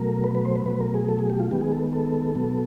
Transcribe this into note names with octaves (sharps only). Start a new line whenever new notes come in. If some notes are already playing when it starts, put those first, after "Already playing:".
Already playing: B2 F#3 A3 A#4
B4
B4
C5
B4
B2 F#3 A3 B4
A#4
G#4
A4
G#4
G4
F4
D#3 G#3 B3 G4
G#4
A4
A4
B2 F#3 B3